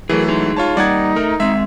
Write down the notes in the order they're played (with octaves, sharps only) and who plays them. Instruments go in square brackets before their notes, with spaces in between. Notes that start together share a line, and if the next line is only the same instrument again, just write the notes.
[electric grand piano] E3 F#3 A3 [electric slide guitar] G#4 A#4
[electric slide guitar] D#4 G#4
[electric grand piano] F4 C#5 A5
[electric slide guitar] G3 A#3 [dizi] D#4 [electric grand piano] D5 F#5 G#6
[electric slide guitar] A3 [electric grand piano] A#4
[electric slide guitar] G#3 C4 [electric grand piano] E5